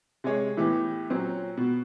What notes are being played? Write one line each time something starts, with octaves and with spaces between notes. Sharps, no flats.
C3 G#3 G#4 C#5 G#5
A2 E3 B3 G4
A#2 F#3 C4 C#4
B2